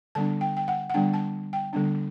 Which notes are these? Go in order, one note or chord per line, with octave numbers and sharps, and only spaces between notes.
D3 G3 B3 D4 A5
G5
G5
F#5
F#5
D3 G3 B3 D4 G5
A5
G5
D3 G3 B3 D4